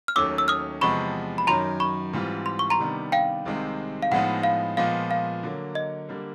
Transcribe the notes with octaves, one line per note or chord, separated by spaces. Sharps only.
F6
D#2 D#3 F#3 A3 C#4 D6 E6
E6
D#6 F6
E2 C3 F3 G#3 B3 B5 C#6
B5
F#2 D#3 F#3 A#5 C6
B5 C#6
G#2 E3 G3 C4 F4
C6
C#6
A#5 C6
C3 D#3 G3 B3 D4
F5 G5
C2 C3 D#3 G#3 C4
F5
A2 F3 G#3 B3 D#4 F#5
F5
A#2 F3 G#3 B3 F5
F5
D3 F#3 A#3
D#5
D3 G3 A#3